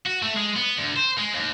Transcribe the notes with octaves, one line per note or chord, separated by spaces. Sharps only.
F#4
A3
G#3
B3
D2
C5
G#3
D#2